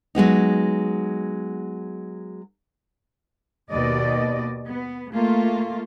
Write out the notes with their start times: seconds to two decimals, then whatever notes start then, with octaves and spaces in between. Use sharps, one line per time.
0.15 F#3 G#3 B3 D#4
3.70 D#2 B2 D5 D#5
4.67 B3
5.11 A3 A#3 F4